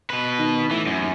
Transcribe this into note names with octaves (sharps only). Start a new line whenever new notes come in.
B2 B4
D#3
A2 E3
F#2
D#2